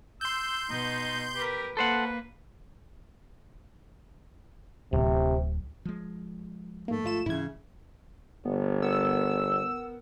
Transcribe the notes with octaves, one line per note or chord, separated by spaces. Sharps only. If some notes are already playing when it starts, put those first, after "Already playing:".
C6 E6 G6
B2 D#4
G4 A#4 B4
A#3 A4 B4 C5 F#5
D1 C3
F3 G#3
G#2 A3 A#3
G#1 F4 E7
G#2 C#3 E3 E4 G#6
G1 B3
B3 A#4 F#5 E6